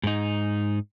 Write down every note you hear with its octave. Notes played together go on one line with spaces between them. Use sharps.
G#2 D#4